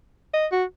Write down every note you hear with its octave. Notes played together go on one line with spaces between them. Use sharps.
D#5
F#4